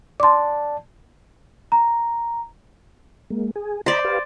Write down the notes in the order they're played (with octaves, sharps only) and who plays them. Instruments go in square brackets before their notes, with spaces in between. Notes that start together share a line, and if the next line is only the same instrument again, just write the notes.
[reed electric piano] D5 A5 [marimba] C6 D6
[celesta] A#5
[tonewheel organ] G#3 A#3
G#4
[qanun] C5 D5 [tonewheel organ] D#5 A#5 B5
[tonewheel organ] G4 B4 F5